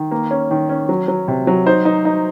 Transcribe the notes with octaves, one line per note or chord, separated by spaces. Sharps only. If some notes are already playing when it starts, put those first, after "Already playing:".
Already playing: D#3
A#3
C#4
D#3
C#4
F#3
F#3
C3
F#3
D#4 C5
D#4
D#4